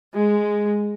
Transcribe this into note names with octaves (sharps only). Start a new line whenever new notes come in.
G#3